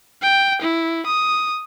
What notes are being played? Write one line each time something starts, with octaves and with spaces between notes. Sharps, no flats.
G5
E4
D#6